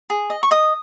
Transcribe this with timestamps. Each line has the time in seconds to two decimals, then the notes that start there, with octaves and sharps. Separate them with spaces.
0.10 G#4
0.30 D#5
0.43 C#6
0.51 D#5 D#6